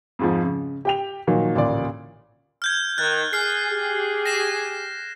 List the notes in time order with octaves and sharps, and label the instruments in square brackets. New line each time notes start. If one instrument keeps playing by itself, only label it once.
[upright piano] F2 G#2 F3
C#3
G4 G5 F7
A#2 D#3 F3 F#3
A1 D2 A#2 D5
[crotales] F6 G6 G#6
[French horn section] D#3 [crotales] F#6 A6
[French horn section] G#4 [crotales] F6 C7
[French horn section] G4 G#4
[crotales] A#6 C7 E7